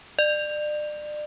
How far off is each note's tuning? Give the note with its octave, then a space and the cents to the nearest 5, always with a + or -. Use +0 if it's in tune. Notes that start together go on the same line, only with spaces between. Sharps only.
D5 +35